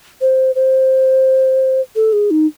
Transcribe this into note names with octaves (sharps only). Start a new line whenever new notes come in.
C5
C5
A4
G#4
D#4